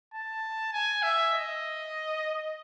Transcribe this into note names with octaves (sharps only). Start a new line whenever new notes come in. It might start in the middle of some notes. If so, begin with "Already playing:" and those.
A5
G#5
E5
D#5